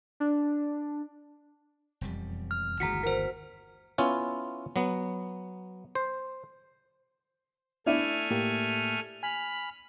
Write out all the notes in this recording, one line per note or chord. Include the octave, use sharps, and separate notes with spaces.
D4
E1 F2 G3
F6
G1 D#2 E3 G#3 F#4 A#5 B6 C#7
F#4 A#4 C5 B6
B3 C#4 E4 F4
F#3 B3
C5
A3 D4 E4 G#5 F6
A2 A#3 G4
G#5 B5 F6